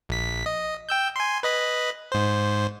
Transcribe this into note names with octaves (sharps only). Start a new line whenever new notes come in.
A#1 B6
D#5
G5 E6 G6
G#5 C6
B4 D#5 B5
G#2 C5